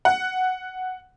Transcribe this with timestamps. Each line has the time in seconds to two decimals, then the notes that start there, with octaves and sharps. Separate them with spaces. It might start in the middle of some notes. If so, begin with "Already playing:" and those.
0.05 F#5